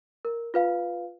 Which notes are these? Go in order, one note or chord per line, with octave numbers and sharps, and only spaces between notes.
A#4
F4 B4 F5